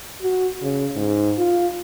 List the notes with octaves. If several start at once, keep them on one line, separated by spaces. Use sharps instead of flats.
F#4
C#3
G#2
F4